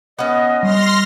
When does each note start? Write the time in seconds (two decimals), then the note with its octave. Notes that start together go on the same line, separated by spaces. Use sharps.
0.19 B3 C#4 D#5
0.63 G3 C6 F6 A#6